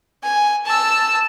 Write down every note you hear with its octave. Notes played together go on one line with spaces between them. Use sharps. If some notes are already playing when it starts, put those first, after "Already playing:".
G#5
A5 E6